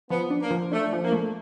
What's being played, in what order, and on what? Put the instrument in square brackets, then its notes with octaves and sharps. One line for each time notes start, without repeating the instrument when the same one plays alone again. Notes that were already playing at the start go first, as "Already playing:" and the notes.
[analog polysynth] F3 [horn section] B3
[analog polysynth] D4
[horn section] A#3
[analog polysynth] F3
[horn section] A3 [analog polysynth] D4
[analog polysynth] F3
[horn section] A#3
[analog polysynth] A3